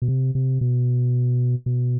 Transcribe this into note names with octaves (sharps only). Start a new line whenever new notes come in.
B2
C3
C3
B2
B2